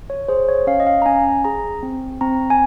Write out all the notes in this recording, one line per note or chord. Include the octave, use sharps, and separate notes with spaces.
C#5
G#4 C5
C#5
C#4 F5
D#5
F5
A#5
C#4 G#5
G#4 A#5
C4
C4 A#5
G#5